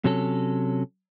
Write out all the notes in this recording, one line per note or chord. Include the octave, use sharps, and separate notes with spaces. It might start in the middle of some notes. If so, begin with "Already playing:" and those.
C3 F#3 C#4 A4